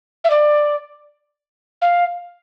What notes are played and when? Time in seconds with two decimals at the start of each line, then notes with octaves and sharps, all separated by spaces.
0.24 E5
0.30 D5
1.81 F5